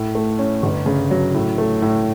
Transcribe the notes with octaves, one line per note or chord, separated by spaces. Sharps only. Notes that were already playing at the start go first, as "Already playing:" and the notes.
Already playing: A2
A3
C#4
G1
C#3
F#3
A2
A3
A2